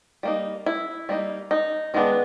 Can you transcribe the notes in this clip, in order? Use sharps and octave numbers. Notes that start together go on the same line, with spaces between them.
G3 A#3 D#4
E4
G3 A#3 D#4
D#4
D#3 G#3 B3 D4